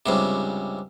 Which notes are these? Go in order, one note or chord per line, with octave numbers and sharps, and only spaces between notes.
C#2 G2 C3